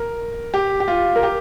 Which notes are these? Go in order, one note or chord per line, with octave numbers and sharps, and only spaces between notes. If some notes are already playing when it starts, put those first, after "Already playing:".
Already playing: A#4
G4
G4
F4
A#4
G4